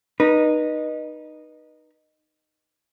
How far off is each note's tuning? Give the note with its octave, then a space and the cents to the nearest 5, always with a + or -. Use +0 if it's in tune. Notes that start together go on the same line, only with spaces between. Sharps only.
D#4 -15 B4 -30